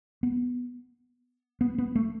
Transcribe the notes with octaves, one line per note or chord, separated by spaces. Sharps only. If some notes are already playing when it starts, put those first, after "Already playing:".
B3
B3
B3
A3